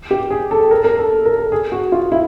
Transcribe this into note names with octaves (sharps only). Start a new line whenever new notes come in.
G4
G#4
A4
A#4
A#4
A4
A#4
A4
G#4
F#4
F4
E4